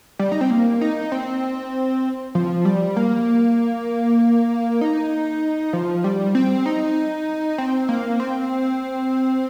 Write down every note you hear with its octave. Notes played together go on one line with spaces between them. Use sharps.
G3
D#4
C4
A#3
D#4
C4
F3
G3
A#3
D#4
F3
G3
C4
D#4
C4
A#3
C4